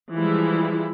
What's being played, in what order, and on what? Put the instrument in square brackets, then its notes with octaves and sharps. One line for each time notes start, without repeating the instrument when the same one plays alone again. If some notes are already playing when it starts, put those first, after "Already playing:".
[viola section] E3 F3 G3 G#3 E4